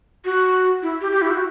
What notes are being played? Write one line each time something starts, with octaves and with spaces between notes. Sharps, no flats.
F#4
E4
G4
G4
E4
F#4